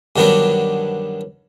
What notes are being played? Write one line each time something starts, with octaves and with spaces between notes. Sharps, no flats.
G2 D3 D#3 F#3 B3 D4